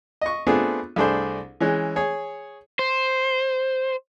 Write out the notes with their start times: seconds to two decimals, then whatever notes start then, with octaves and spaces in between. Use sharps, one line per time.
0.21 D#5 C#6
0.47 A3 B3 C4 D4 F4 G#4
0.96 C2 A3 D4 G#4 C5
1.60 E3 G#3 C#4
1.96 G#4 C#5
2.79 C5